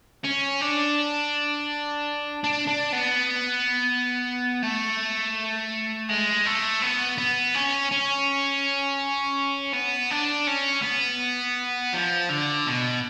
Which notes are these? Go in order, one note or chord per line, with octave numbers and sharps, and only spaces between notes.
C#4
D4
D4
D4
B3
A3
G#3
A3
B3
B3
C#4
C#4
B3
D4
C#4
B3
F3
D3
B2